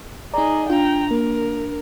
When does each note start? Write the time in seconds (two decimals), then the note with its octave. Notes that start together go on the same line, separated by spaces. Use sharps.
0.34 D#4 G#4 D5 D#5 A#5
0.70 D4 F4 G5 A#5
1.11 A#3 A#4